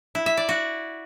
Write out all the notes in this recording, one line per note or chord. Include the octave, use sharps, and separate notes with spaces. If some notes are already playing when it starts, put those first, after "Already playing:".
E4
E5
D5
F#4